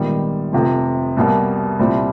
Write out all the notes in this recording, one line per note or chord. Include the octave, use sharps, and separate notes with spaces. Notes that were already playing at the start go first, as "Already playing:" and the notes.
Already playing: A#1 G#2 D#3 G3 B3
F1 F2 C3 F3
C2 B2 G3 A#3
C2 A#2 G3 C4 E4